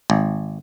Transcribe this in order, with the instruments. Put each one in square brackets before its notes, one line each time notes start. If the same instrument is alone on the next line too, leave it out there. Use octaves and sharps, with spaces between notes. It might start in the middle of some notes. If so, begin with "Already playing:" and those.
[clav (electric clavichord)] G#1